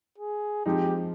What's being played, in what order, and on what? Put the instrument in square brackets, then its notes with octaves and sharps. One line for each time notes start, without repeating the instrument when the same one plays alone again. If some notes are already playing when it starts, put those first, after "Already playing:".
[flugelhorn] G#4
[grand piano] F3 G#3 C4 D#4 [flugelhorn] G4